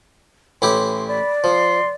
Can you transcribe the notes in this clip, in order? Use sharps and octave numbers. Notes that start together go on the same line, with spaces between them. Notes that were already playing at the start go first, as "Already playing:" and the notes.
A1 E4 G4 C6
D5 B5
F3 C6